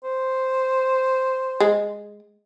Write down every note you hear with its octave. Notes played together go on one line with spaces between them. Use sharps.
C5
G#3